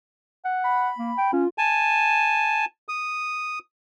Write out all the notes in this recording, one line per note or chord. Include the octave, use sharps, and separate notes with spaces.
F#5
B5
A#3
G5
C#4 F4
G#5 A5
D#6